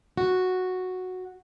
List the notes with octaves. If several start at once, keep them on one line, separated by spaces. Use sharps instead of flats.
F#4